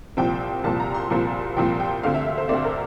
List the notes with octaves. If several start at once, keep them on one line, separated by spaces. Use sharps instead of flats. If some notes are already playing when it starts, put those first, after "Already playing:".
C2 A#2 F3 C4 G5
C2 A#2 F3 C4 A5
A#5
C6
C2 A#2 F3 C4
C2 A#2 F3 C4 G5
G5
D2 D3 A3 C4 F5
E5
E5
C5
D2 D3 A3 C4 D5
A#4